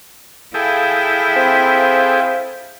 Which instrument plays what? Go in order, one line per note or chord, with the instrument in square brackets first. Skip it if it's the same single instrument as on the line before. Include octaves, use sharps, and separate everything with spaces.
[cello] E4 [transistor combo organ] G#4 A4 G5 [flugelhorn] F5
[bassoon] C4